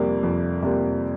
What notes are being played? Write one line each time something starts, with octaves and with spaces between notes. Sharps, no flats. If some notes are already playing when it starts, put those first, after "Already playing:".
Already playing: F2 C3 G3 A#3
F2
C3 G3 A#3